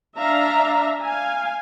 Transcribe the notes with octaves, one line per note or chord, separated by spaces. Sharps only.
D4 E5 F5 A#5
F5 G#5